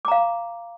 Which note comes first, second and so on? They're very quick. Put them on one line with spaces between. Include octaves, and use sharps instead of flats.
D6 A#5 F5